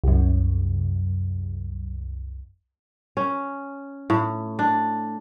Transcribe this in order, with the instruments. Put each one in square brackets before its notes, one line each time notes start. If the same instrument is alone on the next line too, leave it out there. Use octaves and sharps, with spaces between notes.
[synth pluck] C2 F#2
[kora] C#4
A2
D4